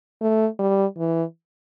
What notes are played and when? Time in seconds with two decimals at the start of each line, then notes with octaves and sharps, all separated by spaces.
0.21 A3
0.59 G3
0.97 E3